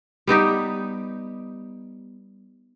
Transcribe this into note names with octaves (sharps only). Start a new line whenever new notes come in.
G3 B3 D#4 G4